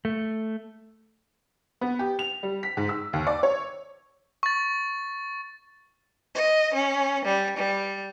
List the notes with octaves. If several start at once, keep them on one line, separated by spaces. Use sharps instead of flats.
A3
B3
G4
F7
G3
B6
G#2
E6
D#2
D5
C#5
C#6 A6
D#5
C#4
G3
G3